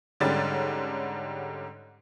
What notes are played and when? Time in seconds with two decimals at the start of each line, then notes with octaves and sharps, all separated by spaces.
0.20 G#2 D3 G3 C#4 A6